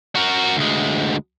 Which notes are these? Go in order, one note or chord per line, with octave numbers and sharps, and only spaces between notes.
F#4 A#4
D2 G#3